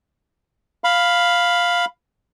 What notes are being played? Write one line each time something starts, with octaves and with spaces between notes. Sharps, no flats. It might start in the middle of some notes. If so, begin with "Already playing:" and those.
F5 B5